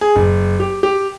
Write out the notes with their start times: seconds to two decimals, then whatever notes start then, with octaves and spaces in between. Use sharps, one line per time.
0.01 G#4
0.16 F#1
0.60 G4
0.83 G4